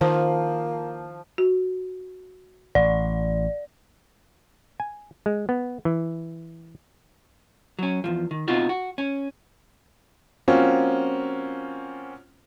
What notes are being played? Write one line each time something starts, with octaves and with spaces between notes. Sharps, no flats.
D#3 F3 A#3 C5
F#4
A1 D5
G#5
G#3
B3
E3
F#3 C#4
E2 G2 F3
D#3
B2 C4 D#4 F4 F#4
F#4
C#4
F3 A#3 C4 C#4 F4 F#4